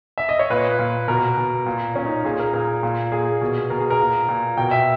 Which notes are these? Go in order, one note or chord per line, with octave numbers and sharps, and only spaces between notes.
E5
D#5
C#5
A#2 B4
A#2
B2 A#4
B2
A#2
A#2 C#4
D#4
A#2 G#4
A#4
A#2 A#4
A#2
A#2 G#4
B2
B2 A#4
G#4
A#4
A#2
A#2
B2 G5
E5